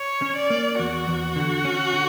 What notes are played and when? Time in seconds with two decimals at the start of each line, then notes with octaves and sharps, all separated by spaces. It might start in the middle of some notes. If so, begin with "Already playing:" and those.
Already playing: C#5
0.22 C#4
0.36 D5
0.50 A#3
0.79 E2 F#4
1.08 E2
1.36 D3
1.65 C#4
1.93 D3